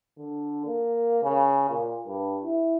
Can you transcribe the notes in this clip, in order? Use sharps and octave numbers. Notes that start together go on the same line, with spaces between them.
D3
A#3
C#3
A#2
G2
E4